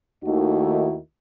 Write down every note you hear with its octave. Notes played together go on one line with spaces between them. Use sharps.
D#2 D#3 A3 D#4 E4 F#4